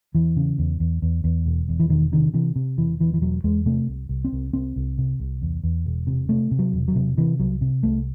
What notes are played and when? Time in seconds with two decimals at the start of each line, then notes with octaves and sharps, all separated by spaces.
0.15 E2 E3
0.37 C#3
0.59 E2
0.80 E2
1.02 E2
1.24 E2
1.46 E1
1.69 E2
1.80 E3
1.90 E1 D#3
2.12 C3 D#3
2.34 C3 E3
2.56 C3
2.77 E1 E3
3.00 E2 E3
3.14 E3
3.22 E1 F#3
3.44 E2 G#3
3.66 C3 A3
3.88 C2
4.09 C2
4.25 C4
4.32 C2
4.53 C2 C4
4.76 C2
4.98 C3
5.20 C2
5.42 E2
5.63 E2
5.86 E1
6.07 C3
6.29 C3 A3
6.51 C3
6.59 F#3
6.73 E1
6.88 F#3
6.96 C3
7.17 C3 E3
7.39 C2 F#3
7.61 C3
7.83 C2 A3